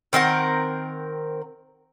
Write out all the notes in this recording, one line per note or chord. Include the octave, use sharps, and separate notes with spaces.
D#3 C4 A#4 F#5